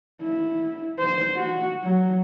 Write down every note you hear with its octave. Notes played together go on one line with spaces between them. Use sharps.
E4
C5
F#4
F#3